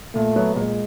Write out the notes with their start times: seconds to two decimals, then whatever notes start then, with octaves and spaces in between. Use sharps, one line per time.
0.15 A#2 A3
0.36 F#3 B3
0.56 A#2 G#3